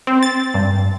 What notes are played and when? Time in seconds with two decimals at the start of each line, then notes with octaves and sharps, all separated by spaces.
0.07 C4
0.23 A6
0.54 G2